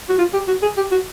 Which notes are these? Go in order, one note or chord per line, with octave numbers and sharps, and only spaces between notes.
F#4
F4
G4
F#4
G#4
G4
F#4